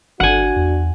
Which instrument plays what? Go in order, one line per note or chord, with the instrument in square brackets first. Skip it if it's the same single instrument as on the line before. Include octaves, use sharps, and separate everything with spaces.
[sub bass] G1 [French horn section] D4 F#4 [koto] F#5 G#5
[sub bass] E2